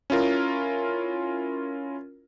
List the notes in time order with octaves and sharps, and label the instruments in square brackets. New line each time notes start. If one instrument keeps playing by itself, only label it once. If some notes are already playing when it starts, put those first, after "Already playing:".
[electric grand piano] C#4 E4 F4 A#4